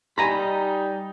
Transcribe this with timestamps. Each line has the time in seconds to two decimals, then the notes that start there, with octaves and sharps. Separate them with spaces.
0.18 G3 D#4 G#5 A#5 B5